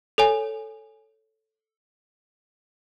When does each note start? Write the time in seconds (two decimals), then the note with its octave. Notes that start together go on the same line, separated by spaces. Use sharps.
0.18 A4 C#5 G#5